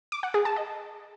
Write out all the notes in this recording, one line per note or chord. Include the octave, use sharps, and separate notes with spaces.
D6
F#5
G#4
A5
D#5